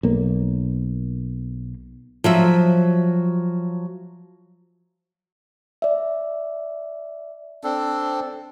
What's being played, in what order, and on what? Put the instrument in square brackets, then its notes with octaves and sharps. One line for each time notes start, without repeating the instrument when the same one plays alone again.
[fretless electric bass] B1 A#3
[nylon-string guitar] F3 F#3 E5
[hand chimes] D5 E5
[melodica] C4 D4 A4